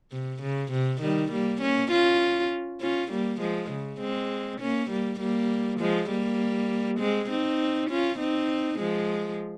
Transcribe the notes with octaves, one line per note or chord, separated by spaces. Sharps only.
C3
C#3
C3
D#3 G3
G3 A#3
A#3 C#4
C#4 F4
C#4 F4
G3 A#3
F3 G#3
C#3
G#3 C4
A#3 C#4
G3 A#3
G3 A#3
F3 G#3
G3 A#3
G#3 C4
C4 D#4
C#4 F4
C4 D#4
F3 G#3